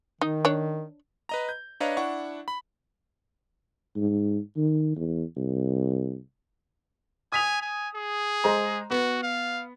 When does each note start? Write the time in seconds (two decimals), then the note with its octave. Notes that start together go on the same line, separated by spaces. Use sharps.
0.21 D#3 D#4
0.45 D4 C#5
1.29 B4 D#5 A#5
1.49 G6
1.80 D4 B4 C#5 D#5 F5 A#5
1.97 D4 E4 F#5 C#6
2.48 B5
3.96 G#2
4.57 D#3
4.96 E2
5.37 C2
7.32 G#5 D#6 B6 F7
7.62 G#5
7.95 G#4
8.44 G#3 C5 A#5
8.91 B3 F#4
9.23 F5